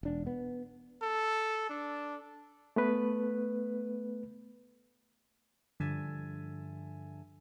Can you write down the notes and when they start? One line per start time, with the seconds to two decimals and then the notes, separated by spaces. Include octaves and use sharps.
0.03 E1 D4
0.27 B3
1.02 A4
1.69 D4
2.76 A3 B3 B4
5.80 G2 D3 F3 E5 G#5 A5